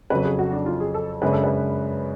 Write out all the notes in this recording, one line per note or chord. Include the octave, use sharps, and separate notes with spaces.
F2 C#3 F#3 B4
G#4
F#4
D4
F4
G#4
A4
F#2 C#3 G#3 D4 B4
A4
B4